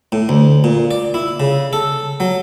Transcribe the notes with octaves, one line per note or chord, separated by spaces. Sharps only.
A2
D2
A#2
D5
E4
C#3
A4
F#3